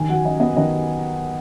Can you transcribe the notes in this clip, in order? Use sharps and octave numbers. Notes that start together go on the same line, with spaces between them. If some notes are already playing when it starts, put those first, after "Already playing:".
Already playing: D#2 D#3 G#5
F#3 F#5
F#2 D#5
B3 D#5
D#3 D#5